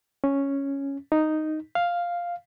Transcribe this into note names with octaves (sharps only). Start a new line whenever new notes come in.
C#4
D#4
F5